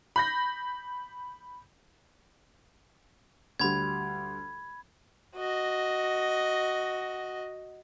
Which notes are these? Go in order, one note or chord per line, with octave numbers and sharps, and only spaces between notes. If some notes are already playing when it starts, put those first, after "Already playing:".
B5 G6 A#6
D2 G3 B5 G#6
F#4 D#5